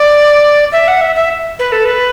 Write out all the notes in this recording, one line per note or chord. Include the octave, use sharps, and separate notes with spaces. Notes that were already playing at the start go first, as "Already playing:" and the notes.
Already playing: D5
E5
F#5
E5
E5
B4
A4
B4